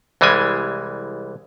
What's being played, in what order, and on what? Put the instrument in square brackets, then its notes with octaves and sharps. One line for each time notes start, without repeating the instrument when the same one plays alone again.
[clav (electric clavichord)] C2 E3 G3 G#3 G#5